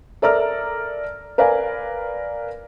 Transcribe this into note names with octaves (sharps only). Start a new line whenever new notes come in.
A4 A#4 D5 E5 A#5 F6
A#4 B4 D5 F5 G#5